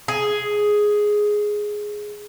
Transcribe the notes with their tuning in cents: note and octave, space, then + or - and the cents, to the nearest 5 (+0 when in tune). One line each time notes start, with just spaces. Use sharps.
G#4 +5